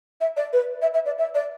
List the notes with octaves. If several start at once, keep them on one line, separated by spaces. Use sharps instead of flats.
E5
D5
B4
E5
E5
D5
E5
D5